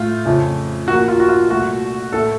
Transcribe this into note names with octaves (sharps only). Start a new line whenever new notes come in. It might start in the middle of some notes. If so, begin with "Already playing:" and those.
Already playing: A2 A3 F4
F2 C#3 F3 A3
A#2 F3 A#3 F#4
F4
F#4
F4
C2 A#2 A3 F#4
A2 A3 A4